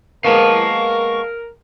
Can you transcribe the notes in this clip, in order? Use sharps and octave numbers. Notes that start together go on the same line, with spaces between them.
G#3 A#3 B3 A#4 F5 A5 C#6